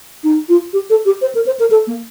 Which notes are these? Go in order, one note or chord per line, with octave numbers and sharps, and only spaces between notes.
D#4
F4
G4
A4
G4
C5
A#4
C5
A#4
A4
A#3